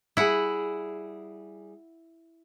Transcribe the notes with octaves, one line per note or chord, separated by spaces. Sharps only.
G3 E4 G#4 F#5